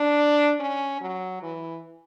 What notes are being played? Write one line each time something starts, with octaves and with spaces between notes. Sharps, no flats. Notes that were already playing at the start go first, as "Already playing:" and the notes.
Already playing: D4
C#4
F#3
E3